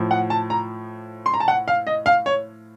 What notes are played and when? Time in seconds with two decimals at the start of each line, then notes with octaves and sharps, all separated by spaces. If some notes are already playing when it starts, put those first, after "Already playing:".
Already playing: A2 F3
0.11 F#5
0.30 A5
0.50 A#5
1.26 C6
1.34 A#5
1.40 A5
1.48 F#5
1.68 F5
1.87 D#5
2.06 F5
2.26 C#5